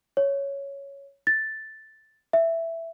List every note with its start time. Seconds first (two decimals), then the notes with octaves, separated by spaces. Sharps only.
0.17 C#5
1.27 A6
2.33 E5